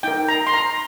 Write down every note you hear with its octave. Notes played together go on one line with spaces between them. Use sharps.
D#4 A#4 G5
A#5
C6
A#5